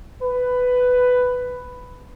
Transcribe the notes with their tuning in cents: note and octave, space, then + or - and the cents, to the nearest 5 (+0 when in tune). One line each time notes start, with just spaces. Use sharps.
B4 +10